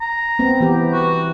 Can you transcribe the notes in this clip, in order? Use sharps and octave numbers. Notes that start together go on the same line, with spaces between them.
A#5
B3 C4
E3 B3 G4
F#4